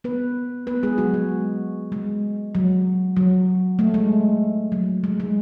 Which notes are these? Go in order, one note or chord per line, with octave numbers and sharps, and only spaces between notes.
B3 B4
B3 B4
G#3 G#4
F#3 F#4
G#3
G#3
F#3
F#3
A3
G#3
F#3
G#3
G#3